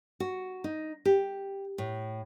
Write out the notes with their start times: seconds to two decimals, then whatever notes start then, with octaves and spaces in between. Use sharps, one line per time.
0.20 F#4
0.64 D#4
1.05 G4
1.78 A2